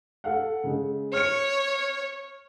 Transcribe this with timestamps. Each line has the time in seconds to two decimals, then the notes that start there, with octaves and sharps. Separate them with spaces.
0.24 A4 F5 F#5
0.64 C#3 G#3
1.13 C#5 F6 C#7